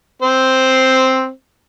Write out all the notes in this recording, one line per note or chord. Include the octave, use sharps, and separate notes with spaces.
C4 C5